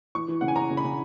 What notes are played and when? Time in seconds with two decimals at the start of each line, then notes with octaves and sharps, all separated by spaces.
0.15 E3 C#6
0.28 E3
0.41 C#3 F#5
0.48 G#5
0.56 C#3 A#5
0.71 C#3
0.77 B5
0.84 C#3